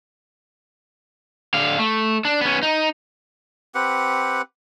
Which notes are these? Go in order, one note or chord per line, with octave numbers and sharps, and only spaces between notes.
D3 F5
A3
D4
B3 C#4
D#4
C4 G4 B4 F#5